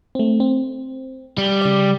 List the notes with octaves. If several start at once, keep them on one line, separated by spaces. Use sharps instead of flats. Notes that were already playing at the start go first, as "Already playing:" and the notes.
A3 C4
C4
G3
C#3 D5